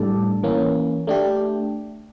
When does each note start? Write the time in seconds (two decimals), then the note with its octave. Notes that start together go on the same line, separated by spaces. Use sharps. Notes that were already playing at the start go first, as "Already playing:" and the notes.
Already playing: A2 G3 D4 A4 D5
0.43 E3 A#3 C#4
1.07 A3 D4 G4